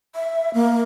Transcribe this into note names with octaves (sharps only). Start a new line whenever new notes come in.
E5
A#3